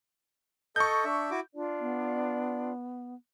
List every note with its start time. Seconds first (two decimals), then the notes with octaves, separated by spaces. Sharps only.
0.76 A4 D#5 C#6 G6
1.05 D4 E5
1.31 E4 F#4 D6
1.54 D4 F4 D5
1.80 B3